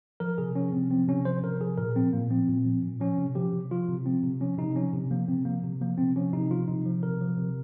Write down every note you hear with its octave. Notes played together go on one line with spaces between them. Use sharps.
F3 A#4
C3 G#4
F3 C#4
C3 C4
F3 C4
C3 C#4
F3 C5
C3 A#4
F3 G#4
A#2 A#4
F3 C4
A#2 A#3
F3 C4
A#2
F3
A#2
F3 C#4
C3
F3 G4
C3
F3 F4
C3
F3 C4
C3
F3 C#4
C3 D#4
F3 C#4
C3
F3 A#3
C3 C4
F3 A#3
C3
F3 A#3
C3 C4
F3 C#4
C3 D#4
F3 F4
C3 D#4
F3
C3 A#4
F3
C3